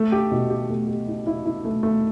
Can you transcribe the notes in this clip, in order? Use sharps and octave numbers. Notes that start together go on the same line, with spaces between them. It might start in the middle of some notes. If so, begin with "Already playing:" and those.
Already playing: A3
G4
B2
G4
A3
G4
E4
E4
E4
A3
A3